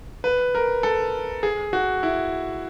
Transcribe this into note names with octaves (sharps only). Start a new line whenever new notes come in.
B4
A#4
A4
G#4
F#4
E4